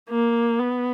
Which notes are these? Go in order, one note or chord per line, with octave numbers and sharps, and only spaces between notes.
A#3
B3